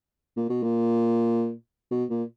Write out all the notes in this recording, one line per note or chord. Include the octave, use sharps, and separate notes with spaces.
A#2
B2
A#2
B2
A#2